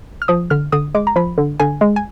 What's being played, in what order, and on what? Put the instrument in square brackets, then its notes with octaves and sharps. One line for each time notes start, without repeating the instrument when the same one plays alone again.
[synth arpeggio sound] F6
F3 D#6
D3 F6
D3 D#6
G#3 D6
A#5
F3 B5
D3
D3 G#5
G#3
G#5